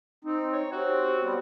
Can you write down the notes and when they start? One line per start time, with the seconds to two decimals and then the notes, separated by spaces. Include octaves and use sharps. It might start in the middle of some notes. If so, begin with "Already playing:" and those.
0.25 C4 D#4
0.53 C#5
0.72 C4 F#4 G4 C5 C#5
1.22 G3 B3 C4